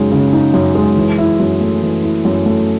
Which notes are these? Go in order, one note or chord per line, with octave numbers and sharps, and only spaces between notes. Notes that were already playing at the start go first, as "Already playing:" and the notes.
Already playing: F#2 C#3 G#3 D#4
C#3
D#4
F#2
G#3
E3
E4
F#2
A3
E3
E4
F#2
A3